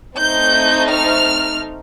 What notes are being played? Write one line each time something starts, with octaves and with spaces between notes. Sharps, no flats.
A3 C4 D#4 G6
F6